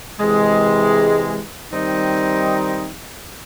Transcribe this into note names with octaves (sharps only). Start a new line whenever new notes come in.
C3 E3 G#3
D#3 G3 C4 D#4